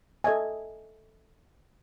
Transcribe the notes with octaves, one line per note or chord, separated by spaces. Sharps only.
A4 D#5 E5 G#5